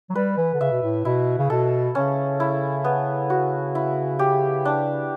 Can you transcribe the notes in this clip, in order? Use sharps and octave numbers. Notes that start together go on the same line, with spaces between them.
F#3
G3 B4
E3
D3
C#3 E5
B2
A2
B2 E4
C#3
B2 A4
C#3 C#4
E4
B3
F#4
E4
G4
D4